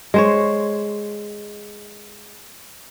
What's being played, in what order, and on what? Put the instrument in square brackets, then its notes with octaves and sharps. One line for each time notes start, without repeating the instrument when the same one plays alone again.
[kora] G#3 C5 C#5